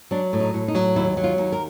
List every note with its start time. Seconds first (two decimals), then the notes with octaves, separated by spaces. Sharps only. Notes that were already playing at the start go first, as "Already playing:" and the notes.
0.11 F#3 D4
0.33 A2
0.40 D#4
0.54 A2
0.68 D#4
0.75 F#3
0.96 D#2 E4
1.17 F#3
1.24 F4
1.38 D#2
1.52 A#4